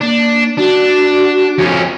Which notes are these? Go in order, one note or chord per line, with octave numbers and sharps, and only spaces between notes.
A#3 D4
D4 F#4
F2 C#4